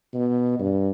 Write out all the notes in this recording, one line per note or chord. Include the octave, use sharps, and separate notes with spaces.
B2
G2